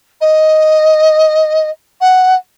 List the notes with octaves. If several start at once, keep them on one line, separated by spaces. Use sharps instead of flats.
D#5
F#5